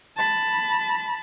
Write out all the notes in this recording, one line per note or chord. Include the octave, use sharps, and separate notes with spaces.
A5 B5